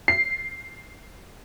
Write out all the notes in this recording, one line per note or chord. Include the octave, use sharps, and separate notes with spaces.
C7